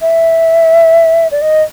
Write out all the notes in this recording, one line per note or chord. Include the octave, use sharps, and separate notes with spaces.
E5
D5
D#5